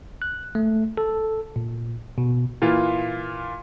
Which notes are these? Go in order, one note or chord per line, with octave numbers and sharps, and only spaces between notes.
F#6
A3
A4
A#2
B2
A#2 E3 F4